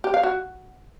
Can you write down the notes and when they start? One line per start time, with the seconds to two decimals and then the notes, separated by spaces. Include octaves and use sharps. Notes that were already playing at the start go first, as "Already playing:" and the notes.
0.04 G4
0.14 F5
0.23 F#4